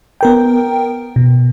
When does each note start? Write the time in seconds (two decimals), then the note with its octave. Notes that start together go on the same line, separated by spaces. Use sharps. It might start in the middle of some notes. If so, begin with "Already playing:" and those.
0.21 B3 A#4 G5
1.16 B2